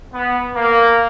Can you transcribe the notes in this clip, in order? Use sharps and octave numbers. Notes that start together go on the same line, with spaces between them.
B3
A#3